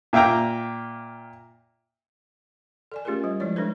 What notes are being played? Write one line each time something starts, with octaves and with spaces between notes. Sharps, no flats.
A#2 E5 F5 G5 A#5
A4 D5 G#5
A3 C#4 F4 G4 G#4 A#4
G3 C5
F3 G#3 E4 C#5 D5
G#3 D4 A4 B4 C5